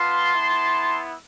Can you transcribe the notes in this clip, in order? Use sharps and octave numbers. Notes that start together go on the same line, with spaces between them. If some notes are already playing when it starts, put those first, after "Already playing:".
Already playing: B3 F4 A5 C6
B3 E4